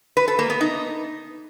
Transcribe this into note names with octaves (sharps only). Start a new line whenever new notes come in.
B4
A4
A#3
B3
D#4